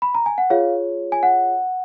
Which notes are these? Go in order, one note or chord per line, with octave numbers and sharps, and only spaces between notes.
B5
A#5
G#5
F#5
F4 G#4 C#5 F5
G#5
F#5